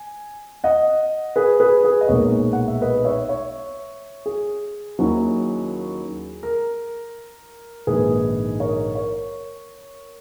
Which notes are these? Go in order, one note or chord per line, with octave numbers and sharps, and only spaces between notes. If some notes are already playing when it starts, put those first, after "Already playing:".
Already playing: G#5
D#5 F#5
G#4 B4
G#4 B4
G#4 B4
D#5
B1 A#2 G#3 B3 A#4 C#5
F#5
E5
B4 D#5
C#5 E5
C#5 E5
G#4
D#2 D#3 F#3 C#4 E4
A#4
A#1 G#2 D#3 G#4 B4
A#4 C#5
A#4 C#5